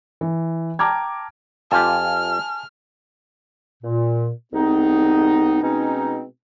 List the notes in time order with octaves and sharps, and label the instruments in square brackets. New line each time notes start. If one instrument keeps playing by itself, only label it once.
[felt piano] E3
G5 A5 A#5 D6 F6 G#6
[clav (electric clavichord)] F2 F4 G4 [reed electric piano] G#5 A5 [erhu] F6
[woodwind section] A#2
C2 G#3 B3 C4 D#4
B2 G#3 C4 C#4 D#4